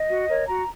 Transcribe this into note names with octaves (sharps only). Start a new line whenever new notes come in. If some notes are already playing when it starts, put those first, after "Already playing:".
Already playing: D#5
F#4
A#4 C#5
F#4 A#5